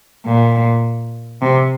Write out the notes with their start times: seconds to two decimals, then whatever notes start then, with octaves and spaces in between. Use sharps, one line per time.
0.26 A#2
1.42 C3